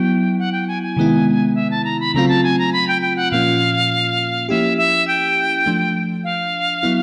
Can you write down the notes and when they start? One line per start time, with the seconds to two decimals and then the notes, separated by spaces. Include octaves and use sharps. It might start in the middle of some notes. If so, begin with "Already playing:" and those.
Already playing: F#3 B3 E4 G5
0.39 F#5
0.52 G5
0.68 G#5
0.83 G#5
0.96 C3 D#3 G#3 B3 E4
1.55 E5
1.71 A5
1.85 A#5
2.00 B5
2.14 C#3 F#3 A3 C4 F4 A#5
2.28 A5
2.44 G#5
2.59 A#5
2.73 B5
2.88 G5
3.02 G5
3.16 F#5
3.31 A#2 F3 A#3 C#4 F4 F5
4.49 F3 A#3 C#4 E4 G4 E5
4.78 E5
5.08 G5
5.66 F3 A3 D4
6.24 F5
6.83 F#3 B3 E4